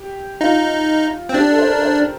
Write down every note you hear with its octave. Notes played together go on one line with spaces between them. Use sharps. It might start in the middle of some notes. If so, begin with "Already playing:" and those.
Already playing: G4
D#4 F4
C4
D4 G4
A4
C5
A#4
C5